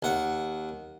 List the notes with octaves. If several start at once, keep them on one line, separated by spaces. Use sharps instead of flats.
D#2 F#5